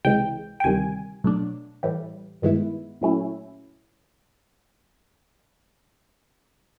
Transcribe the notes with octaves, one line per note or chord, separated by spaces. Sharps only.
C#2 C3 E3 G#3 G5
G5
D2 C3 D#3 G3 G#5
B2 F#3 A3 D4
A2 E3 G3
G2 D#3 G#3 B3 E4
A#2 F#3 A3 C#4 E4